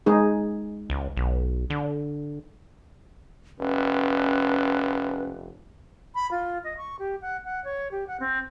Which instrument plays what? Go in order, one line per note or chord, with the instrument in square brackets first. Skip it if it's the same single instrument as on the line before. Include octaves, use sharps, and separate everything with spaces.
[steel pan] G#3 D#4 G#4
[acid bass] C#2
B1
D3
[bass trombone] F1 [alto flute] C#4 [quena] B4
[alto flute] B5
F4
D#5
C#6
G4
F#5
F#5
C#5
G4
F#5
C4